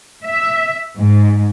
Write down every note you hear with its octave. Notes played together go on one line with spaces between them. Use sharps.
E5
G#2